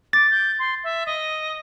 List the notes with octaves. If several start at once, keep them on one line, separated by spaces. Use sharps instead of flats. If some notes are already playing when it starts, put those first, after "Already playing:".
D6 A6
G6
C6
E5
D#5